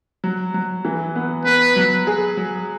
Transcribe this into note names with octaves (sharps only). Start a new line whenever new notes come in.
F#3
F#3
E3
B3
B3 B4
F#3
G#4
F#3